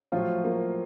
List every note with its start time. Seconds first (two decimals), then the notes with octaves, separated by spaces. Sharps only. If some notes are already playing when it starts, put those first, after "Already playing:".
0.12 A2 F3 F#3 F4
0.44 A#3